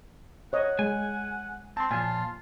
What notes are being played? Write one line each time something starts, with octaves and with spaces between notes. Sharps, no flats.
C#5 D#5 F#5
G#3 G#5
C4 A5 C6
A#2 F3 F4 G#5